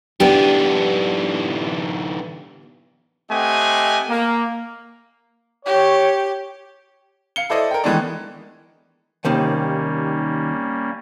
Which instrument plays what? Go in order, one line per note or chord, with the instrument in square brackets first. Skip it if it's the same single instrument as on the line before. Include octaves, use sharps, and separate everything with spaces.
[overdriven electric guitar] D3 E3 [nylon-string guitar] B3 D4 G4
[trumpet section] A3 C4 G4 D#5 F#5 G#5
A#3
[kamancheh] G4 [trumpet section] C#5
[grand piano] F5 C#7 G7
E4 A4 C5 D5 D#5
A#4 G5
D#3 E3 G#3 A3 B3 D4
[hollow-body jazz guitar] D#2 C3 D#3 [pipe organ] G3 A#3 C#4